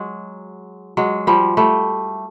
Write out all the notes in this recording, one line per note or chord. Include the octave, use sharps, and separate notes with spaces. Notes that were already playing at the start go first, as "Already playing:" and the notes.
Already playing: F#3 G#3
F#3 G#3
F3 G3
G3 A3